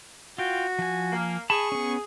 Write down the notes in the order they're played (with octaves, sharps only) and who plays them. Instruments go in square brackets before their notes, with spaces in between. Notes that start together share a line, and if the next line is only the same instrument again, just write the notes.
[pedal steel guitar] F4 G5 [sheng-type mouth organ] F#4
[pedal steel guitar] F3 G#5
[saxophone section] A#3
[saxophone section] G#4 [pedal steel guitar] A5 B5 [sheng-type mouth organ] C#6
[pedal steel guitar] B3 C#4